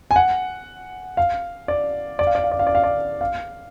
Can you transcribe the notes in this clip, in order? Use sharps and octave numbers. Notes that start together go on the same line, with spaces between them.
G#5
F#5
F5
D5
D5
F5
D5
F5
D5
F5
D5
F5
D5
F5